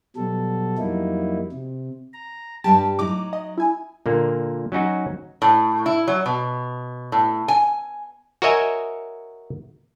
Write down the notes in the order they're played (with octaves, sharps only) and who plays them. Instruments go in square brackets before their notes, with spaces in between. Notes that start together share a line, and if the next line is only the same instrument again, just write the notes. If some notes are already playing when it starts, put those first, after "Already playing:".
[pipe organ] B2 F#3 G3 A4
F2 F#3 G3 A#3 D#4 E4
C3
A#5
[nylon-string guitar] G2 G3 G4 [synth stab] A5
[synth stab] A2 D6 [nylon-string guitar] F#3 D#4
[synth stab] D#5
E4 G#5
[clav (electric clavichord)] A#2 D3 A#3
F#3 C#4 D#4 F#4
[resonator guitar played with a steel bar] A2
E4
F#3
B2
A2
G#5
[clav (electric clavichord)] F#4 A#4 C#5 D#5 E5 G#5